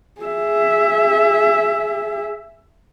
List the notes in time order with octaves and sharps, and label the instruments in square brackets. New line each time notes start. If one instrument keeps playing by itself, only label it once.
[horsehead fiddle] G#4 E5